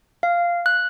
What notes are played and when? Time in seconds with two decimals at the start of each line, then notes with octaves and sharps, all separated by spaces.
0.23 F5
0.66 F#6